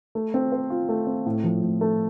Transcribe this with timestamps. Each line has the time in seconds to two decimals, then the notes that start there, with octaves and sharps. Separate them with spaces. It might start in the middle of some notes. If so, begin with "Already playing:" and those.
0.15 A3
0.34 C4
0.52 C5
0.70 F4
0.89 A3
1.07 C4
1.26 A2
1.44 F3
1.63 A2
1.81 A3